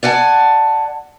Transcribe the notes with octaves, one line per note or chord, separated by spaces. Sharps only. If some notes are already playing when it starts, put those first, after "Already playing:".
D5 F#5 G#5 A5